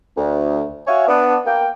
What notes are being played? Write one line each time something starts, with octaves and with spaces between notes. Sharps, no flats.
D2
F#4 C#5 E5 F5 G#5
B3 D4
A#3 G5